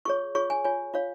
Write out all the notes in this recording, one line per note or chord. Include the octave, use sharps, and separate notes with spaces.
F4 G#4 C#5 C#6
F4 G#4 C#5 C#6
G#5
F4 C#5 G#5
F4 C#5 F5